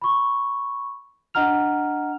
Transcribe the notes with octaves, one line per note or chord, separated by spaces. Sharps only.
B5 C#6
D4 D#5 F#5 A#5 F6 F7